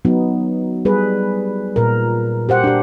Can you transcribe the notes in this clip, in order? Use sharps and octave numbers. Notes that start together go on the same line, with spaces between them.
F#3 B3 D#4
G3 G#4 B4
A#2 A#4
G4 C5 F#5
D4 G4